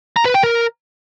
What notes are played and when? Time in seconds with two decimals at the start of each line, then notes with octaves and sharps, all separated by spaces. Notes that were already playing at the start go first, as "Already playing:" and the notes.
0.16 A#5
0.25 B4
0.34 G5
0.43 A#4